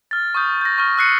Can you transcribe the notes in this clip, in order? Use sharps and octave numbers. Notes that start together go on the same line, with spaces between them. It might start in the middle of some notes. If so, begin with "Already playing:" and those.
F6 A6
C#6 D#6 G6
G6 A#6
C#6 F6
E6 F#6 C7 C#7 D#7